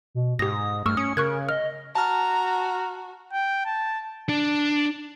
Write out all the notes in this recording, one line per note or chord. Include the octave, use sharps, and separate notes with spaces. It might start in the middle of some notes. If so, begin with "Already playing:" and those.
B2
G#2 G4 D#6 A#6
G2 A3 C#6 E6 F6
C#4 D#6 C#7
C#3 A#4 C#6 F#6 G#6
D#5 F6
F#4 A5 A#5 F6
G5
A5
D4